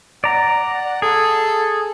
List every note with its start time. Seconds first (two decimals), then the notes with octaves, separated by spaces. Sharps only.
0.24 D5 F#5 A#5
1.02 G#4 A4